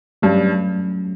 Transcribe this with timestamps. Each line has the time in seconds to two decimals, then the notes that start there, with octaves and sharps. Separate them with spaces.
0.22 G2 F#3 A3 C#4